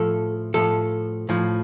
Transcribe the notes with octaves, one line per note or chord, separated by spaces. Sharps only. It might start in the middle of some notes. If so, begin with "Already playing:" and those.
Already playing: A2 F3 A4
A2 F3 A4
A2 F3